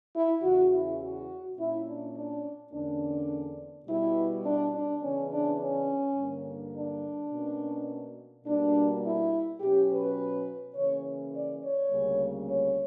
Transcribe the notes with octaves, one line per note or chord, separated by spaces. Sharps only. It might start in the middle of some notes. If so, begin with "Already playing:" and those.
E4
E2 C#3 E3 F#4
E4
F#4
A#2 A#3 C#4 E4
D4
D4
E2 D3 A#3 C#4 D4
B2 G3 B3 E4
D4
D4
C#3 E3 B3 C#4
D4
C#4
G2 D3 A#3
D4
B2 A#3 C#4
B2 G3 A#3 D4
E4
B2 F#3 C#4 G4
B4
C#3 E3 A#3 C#4 C#5
D5
C#5
D2 C#3 G3 A#3 C#4
C#5